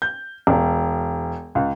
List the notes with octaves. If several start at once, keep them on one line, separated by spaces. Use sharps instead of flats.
G6
E1
C#2